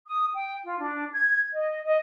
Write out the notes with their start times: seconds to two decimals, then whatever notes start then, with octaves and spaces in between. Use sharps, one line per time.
0.08 D#6
0.35 G5
0.64 F4
0.80 D4
1.13 G#6
1.53 D#5
1.85 D#5